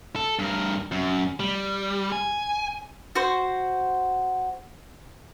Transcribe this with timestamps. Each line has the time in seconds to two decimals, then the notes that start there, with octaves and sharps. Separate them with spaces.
0.16 A4
0.39 G2 A#4
0.92 F#2
1.40 G3
2.12 G#5
3.15 F#4 C5